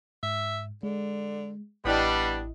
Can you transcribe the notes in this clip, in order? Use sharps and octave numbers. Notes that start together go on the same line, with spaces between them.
G#2 E5
D3 G#3
A1 G3 B3 D4 E4 D#5